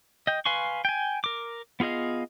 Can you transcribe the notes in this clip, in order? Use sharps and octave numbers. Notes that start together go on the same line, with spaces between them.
D#5 G5
B4 F5 G#5 C6 C#6
G5 G#5
A#4 D6
B3 F4 G#4 D#5 F5